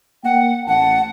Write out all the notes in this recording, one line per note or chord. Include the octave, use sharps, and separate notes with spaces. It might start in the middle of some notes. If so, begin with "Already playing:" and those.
A#3 F#5 G5
A1 F#5 A5